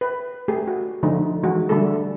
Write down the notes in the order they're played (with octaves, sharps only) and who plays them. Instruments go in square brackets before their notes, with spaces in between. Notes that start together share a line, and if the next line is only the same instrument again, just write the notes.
[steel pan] B4
A3 G4 G#4
F#4
D3 F3 A3 D#4
E3 G#3 F#4
D3 G3 A3 G#4 A4